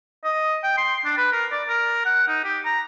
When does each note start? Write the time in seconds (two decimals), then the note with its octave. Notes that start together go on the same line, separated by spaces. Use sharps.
0.24 D#5
0.63 G5
0.77 C6
1.05 D4
1.17 B4
1.32 A#4
1.52 D5
1.69 A#4
2.05 F#5
2.28 D#4
2.45 G4
2.66 A#5